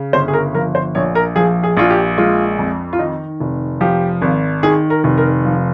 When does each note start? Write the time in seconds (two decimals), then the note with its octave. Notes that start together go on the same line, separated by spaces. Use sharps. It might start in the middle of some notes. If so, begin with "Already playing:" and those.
Already playing: C#3
0.13 G1 C5
0.28 G#4
0.34 A#4
0.54 F3 A#4
0.75 C5
0.95 A#1 C#5
1.15 A#4
1.36 F3 G#4
1.63 G#4
1.77 A#1 F4
1.90 G4
2.18 G#3 F4
2.59 F2
2.93 F4
2.99 D#3 D#4
3.40 F1
3.81 F3 G4
4.22 G#1
4.63 D#3 G#4
4.90 A#4
5.04 F1
5.18 A#4
5.45 F3